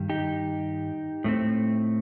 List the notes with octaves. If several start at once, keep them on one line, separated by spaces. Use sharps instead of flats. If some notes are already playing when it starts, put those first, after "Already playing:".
Already playing: G2 D#3 G3
D#4 G4
A2 A3 C4